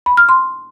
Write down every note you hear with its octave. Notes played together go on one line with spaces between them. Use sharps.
B5
F6
C6